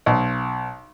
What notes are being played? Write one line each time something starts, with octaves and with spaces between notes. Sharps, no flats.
B1